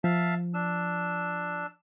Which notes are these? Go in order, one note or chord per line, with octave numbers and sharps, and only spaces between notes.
F3 E5 F5 A5
D4 E6